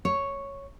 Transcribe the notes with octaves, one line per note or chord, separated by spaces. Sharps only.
C#5